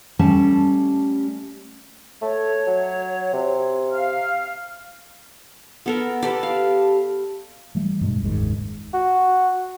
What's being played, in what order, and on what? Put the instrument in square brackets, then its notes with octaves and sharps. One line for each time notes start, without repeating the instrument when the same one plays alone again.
[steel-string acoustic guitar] G3 A3 C#4 G5 A5
[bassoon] A3 [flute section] C#5
[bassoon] F#3
C3
[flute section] F5 F6
[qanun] B3 A4 A#4
[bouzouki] G4 A4 B4 [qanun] D5
[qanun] F5
[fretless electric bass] E3 G3 A3
G2 B2 G#3
F#1 D#2 G#2 D#3
[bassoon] F#4